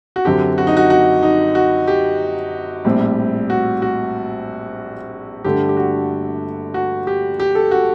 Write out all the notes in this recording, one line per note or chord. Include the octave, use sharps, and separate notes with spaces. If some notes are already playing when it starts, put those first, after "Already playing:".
F#4
F#2 D3 F#3 C4 G4
F#4
D#4
F#4
F#4
D#4
F#4
G4
A#1 A2 G3 C4
F#4
F#4
G2 D3 A3 D4 G4
G4
F#4
F#4
G4
G4
A4
F#4